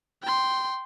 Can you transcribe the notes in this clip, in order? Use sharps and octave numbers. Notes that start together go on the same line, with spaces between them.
G5 C6